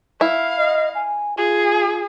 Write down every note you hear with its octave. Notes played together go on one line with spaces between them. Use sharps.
E4 F5
D#5
G#5
F4 G#4